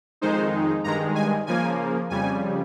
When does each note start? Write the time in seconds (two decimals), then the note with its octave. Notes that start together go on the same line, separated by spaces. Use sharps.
0.21 F2 D#3 G#3 D#4 C5
0.84 G2 D#3 G#3 A#5
1.15 G#5
1.47 C#3 F3 A#3 G#5
2.10 F2 C#3 G3 G#5